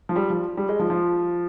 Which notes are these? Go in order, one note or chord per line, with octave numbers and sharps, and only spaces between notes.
F3
G3
F3
G3
G#3
F3
F3